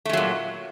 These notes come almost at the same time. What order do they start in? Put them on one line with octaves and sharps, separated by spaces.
A3 G#3 F#3 A#2